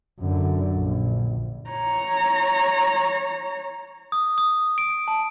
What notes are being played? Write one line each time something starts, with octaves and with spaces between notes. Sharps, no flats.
F#2 D3
A#1
C#5 A#5
D#6
D#6
D7
A5